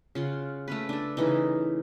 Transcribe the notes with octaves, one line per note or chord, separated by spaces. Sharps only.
C#3 F4 F#5
A3 C#4 B4
D4 A4
C#3 E3 D#4